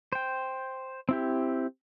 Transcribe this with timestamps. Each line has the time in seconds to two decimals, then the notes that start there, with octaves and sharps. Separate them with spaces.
0.13 C5 G5
1.09 C4 E4 G4